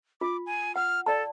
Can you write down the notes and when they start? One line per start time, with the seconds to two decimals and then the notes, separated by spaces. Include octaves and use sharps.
0.21 F4 D6
0.46 G#5
0.76 F#5 F6
1.06 A4 D5 A5